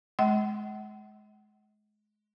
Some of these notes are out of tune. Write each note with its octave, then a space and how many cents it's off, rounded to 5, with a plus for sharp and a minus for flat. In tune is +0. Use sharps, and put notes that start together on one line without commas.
G#3 +25 D#5 +45 F#5 +35